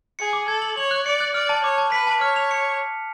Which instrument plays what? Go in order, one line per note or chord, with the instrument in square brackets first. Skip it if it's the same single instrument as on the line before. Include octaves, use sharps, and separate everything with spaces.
[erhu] G#4 [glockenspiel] C#7
[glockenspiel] D6
[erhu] A4 [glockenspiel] G#6
[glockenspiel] F#7
[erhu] C#5 [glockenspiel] F#7
[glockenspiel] F#6
[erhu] D5 [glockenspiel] C#7
[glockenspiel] F#6
[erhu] D5 [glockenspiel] F6
[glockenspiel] A5
[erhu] C#5 [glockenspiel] D6
[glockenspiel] A5
[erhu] B4 [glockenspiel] B6
[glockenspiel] A5
[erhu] C#5 [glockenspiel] F6
[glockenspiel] F7
C#7